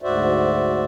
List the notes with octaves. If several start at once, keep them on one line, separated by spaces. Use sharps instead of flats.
D2 G#2 F#4 C5 D5 E5